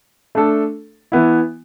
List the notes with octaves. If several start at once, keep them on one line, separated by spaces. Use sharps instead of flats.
A3 D4 A4
E3 B3 E4